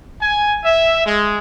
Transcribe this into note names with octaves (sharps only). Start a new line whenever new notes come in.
G#5
E5
G#3